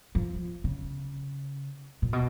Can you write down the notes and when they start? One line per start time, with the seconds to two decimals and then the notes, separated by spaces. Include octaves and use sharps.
0.15 F3
0.64 C#3
2.02 A#2
2.13 B2